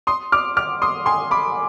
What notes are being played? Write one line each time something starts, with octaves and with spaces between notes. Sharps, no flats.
C6 D#6
D6 F6
D6 F6
C6 D#6
G#5 C6
B5 D6